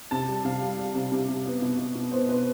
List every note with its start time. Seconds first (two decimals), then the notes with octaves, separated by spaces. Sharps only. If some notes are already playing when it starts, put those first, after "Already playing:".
0.11 C3 A5
0.28 G3
0.45 C3 F5
0.62 G3
0.79 G3
0.95 C3
1.12 C3
1.28 C3
1.46 B3
1.62 B2
1.78 B2
1.95 B2
2.12 B3 C5
2.28 B2 B4